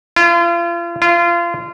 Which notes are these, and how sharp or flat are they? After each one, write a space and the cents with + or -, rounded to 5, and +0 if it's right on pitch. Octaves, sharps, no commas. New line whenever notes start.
F4 -35
F4 -25